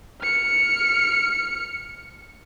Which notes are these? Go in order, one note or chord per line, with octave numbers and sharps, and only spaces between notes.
F6 C#7